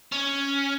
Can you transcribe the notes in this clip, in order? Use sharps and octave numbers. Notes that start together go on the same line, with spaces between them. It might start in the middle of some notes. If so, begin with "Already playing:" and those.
C#4